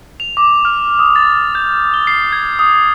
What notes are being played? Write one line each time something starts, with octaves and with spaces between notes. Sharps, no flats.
F7
D6
F6
D#6
A6
G6
G7
C7
G#6
D#6